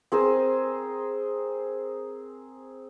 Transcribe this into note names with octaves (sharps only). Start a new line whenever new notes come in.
C4 G#4 A#4 C5